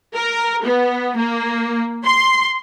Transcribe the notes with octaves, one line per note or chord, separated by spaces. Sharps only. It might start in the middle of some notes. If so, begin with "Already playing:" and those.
A#4
B3
A#3
C6